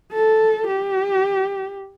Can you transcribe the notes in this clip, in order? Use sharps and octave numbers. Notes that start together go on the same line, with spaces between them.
A4
G4